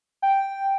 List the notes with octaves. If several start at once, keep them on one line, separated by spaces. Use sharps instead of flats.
G5